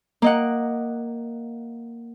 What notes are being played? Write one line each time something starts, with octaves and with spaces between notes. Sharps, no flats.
A#3 D#5 F#5